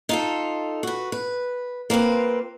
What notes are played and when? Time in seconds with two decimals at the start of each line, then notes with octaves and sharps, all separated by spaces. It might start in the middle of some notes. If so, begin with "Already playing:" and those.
0.09 D#4 F4 A4
0.83 F#4 B4
1.12 B4
1.90 A#3 C4 F4 B4